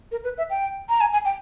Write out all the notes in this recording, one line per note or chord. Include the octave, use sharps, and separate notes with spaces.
A#4
B4
E5
G5
A#5
G#5
G#5
G5